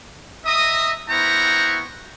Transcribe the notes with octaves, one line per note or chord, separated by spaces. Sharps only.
D#5 E5 A#5 D#6
B3 E4 C5 G5 A#5 C#6